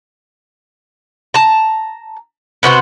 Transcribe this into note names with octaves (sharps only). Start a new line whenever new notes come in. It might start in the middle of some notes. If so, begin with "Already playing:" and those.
A5 A#5
C3 B3 F#4 C5